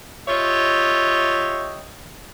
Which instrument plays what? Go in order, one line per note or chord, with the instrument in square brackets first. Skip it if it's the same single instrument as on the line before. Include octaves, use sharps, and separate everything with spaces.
[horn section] F4 G4 C#5 D#5 E5